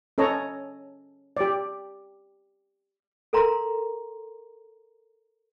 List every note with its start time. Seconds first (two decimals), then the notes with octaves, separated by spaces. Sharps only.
0.18 C#4 A4 C#5 D#5 A#5
1.37 G4 D5
3.33 A4 A#4 F5 A#5 C6